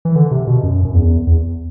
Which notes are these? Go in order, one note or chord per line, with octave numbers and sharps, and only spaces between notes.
E3
D3
C3
B2
F#2
F#2
E2
E2